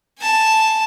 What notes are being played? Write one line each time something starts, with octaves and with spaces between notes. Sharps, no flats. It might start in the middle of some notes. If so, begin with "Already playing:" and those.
G#5 A5